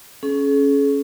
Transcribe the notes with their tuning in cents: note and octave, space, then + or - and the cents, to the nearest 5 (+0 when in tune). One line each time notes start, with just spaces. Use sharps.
C#4 +0 G#4 +45